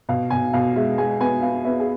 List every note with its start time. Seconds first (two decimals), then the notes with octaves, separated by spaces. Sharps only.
0.09 B2 F5
0.30 B2 G#5
0.53 B2 F5
0.76 G#3 E5
0.98 G#3 G#5
1.20 B3 G#5
1.42 B3 F5
1.65 B3 E5
1.80 G#4